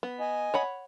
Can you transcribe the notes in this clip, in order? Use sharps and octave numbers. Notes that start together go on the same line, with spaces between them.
B3
D#5 G#5
C#5 F#5 B5